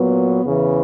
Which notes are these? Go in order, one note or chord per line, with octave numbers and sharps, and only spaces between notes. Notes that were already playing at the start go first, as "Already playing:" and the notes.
Already playing: A#2 F#3 B3
E2 C#3 E3